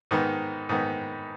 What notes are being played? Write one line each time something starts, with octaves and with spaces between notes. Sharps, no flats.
G#2 D#3 B3
G#2 D#3 B3